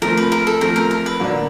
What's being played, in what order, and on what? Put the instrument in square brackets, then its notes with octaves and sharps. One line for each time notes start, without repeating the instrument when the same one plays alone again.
[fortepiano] F3 A3 C4 [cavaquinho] A#4
[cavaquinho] B4
A#4
A4
[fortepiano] F3 A3 C4 [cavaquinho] A#4
[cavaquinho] A#4
A#4
B4
[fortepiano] D3 F#3 A#3 D4